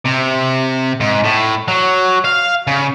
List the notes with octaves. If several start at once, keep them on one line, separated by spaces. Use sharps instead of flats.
C3
G#2
A2
F#3
F5
C#3